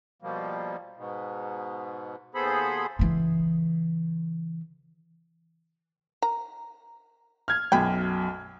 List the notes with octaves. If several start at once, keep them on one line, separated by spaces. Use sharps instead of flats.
B2 F3 G3 A#3
G#2 B2
D#2 B3 G#4 A4 C5 B5
C#3 E3
A#4 A#5
F6 G#6
B1 F#2 G5 B5